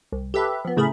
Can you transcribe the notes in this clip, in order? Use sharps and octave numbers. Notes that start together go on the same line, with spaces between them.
C2
G4 A4 B4 E5
F3 B3
A2 C#3 A3 G#4 A#4 B5